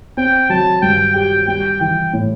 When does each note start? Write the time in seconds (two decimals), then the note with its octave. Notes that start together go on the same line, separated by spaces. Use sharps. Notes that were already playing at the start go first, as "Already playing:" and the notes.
0.17 C4 G5
0.50 F#3 A5
0.82 G2 G5
1.15 G4 G5
1.48 G3 G5
1.81 E3 G5
2.13 A2